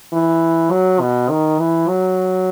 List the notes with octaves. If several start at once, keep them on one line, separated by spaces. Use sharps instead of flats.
E3
F#3
B2
D#3
E3
F#3